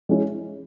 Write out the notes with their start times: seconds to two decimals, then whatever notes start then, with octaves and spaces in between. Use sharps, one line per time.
0.09 G#3 C#4 E4